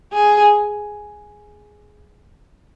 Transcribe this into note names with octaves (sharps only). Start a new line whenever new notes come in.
G#4